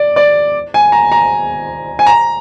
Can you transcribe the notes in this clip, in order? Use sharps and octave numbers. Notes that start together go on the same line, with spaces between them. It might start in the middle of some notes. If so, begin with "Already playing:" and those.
Already playing: D5
D5
G#5
A#5
A#5
G#5
A#5